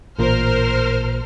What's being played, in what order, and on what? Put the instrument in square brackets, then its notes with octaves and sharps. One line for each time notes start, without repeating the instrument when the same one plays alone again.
[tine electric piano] A1 A#2 [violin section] A#4 C5 F6